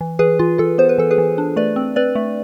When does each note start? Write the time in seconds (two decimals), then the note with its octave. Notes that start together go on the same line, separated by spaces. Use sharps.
0.01 E3
0.19 E3 G#4 B4
0.39 E3 F4
0.58 E3 F4 A4
0.78 B3 C5
0.89 B4
0.98 E3 A4
1.11 G#4 B4
1.18 E3
1.38 D4
1.56 A3 B4 D5
1.76 C4
1.96 C4 B4 D5
2.15 A3